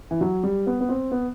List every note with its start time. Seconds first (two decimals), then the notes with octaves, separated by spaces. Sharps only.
0.11 E3
0.21 F#3
0.43 G3
0.67 B3
0.81 B3
0.89 C4
1.12 B3